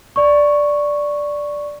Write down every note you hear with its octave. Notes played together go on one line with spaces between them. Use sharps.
D5 C#6